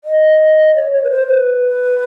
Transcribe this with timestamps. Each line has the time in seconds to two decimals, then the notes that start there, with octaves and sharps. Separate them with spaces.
0.04 D#5
0.76 C#5
0.93 C#5
1.04 B4
1.10 C5
1.28 B4